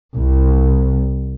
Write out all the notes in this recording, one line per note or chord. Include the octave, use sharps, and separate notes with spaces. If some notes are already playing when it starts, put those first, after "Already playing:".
C2